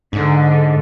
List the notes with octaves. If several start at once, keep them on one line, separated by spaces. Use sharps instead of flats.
G#2 D3